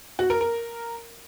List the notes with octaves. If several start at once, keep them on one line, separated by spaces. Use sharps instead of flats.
F#4
A#4
A#4